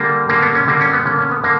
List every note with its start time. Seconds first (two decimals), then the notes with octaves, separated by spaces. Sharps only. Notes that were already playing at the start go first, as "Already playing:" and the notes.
Already playing: D3 G3 A#3
0.29 D3 G3 A#3
0.42 B3
0.55 C#4
0.68 D3 G3 A#3
0.81 C#4
0.93 B3
1.05 D3 A#3 C#4
1.19 C#4
1.31 B3
1.44 D3 A#3